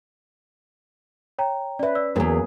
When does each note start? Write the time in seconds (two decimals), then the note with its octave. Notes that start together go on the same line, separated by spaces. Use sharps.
1.38 C#5 G5 A#5
1.79 C#4 B4 D5 E5
1.95 D5 E6
2.16 E2 G#2 F#3 A#3 G#4 A#4 A#5